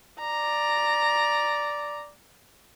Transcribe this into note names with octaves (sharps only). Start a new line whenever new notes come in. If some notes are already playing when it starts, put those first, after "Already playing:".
D5 A#5